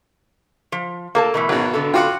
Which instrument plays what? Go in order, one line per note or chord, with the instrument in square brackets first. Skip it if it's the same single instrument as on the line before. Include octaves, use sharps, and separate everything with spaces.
[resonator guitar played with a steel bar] F3
[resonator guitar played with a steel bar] A#3 A4 A5 [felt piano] A#4 F5
[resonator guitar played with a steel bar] B2 E3 A3
[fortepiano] G#1 B2 [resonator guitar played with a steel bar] F#3 G#4
[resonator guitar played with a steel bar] D3 B3 A4
[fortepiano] F4 F#4 F#5 [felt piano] G5 C6 D6